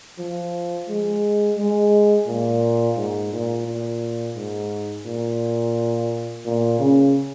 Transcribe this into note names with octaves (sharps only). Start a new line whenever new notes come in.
F3
G#3
G#3
A#2
G#2
A#2
A#2
G#2
A#2
A#2
C#3